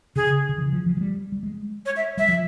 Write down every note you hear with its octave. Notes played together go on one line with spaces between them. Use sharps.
C#3 G#4
C#3
E3
F3
F3
F3
G3
G3
G#3
C#5
E5
G3 E5
F3